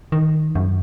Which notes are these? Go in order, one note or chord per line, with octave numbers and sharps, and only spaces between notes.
D#3
F#2